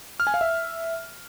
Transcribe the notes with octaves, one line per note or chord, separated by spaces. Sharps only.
F6
G#5
F5
E5